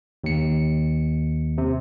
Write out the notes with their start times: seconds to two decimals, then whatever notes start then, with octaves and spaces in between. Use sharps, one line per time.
0.24 D#2 C#7
1.58 C3